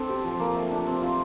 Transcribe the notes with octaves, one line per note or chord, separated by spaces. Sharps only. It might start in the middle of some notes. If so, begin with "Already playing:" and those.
Already playing: C4 D4 A4
G4
F3
A#3
A3
D4
C4
F4